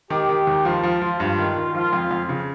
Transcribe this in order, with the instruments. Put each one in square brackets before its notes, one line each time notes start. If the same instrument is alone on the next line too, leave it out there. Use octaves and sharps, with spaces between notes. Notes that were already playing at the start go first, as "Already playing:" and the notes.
[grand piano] D#3 [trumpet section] G4
[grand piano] D#3
D#2
[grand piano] F3 [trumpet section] F4
[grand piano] F3
F3
[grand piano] G2 [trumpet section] F4
[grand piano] D#3
D#3
[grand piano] F3 [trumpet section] F4
[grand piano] F2
F2
C#3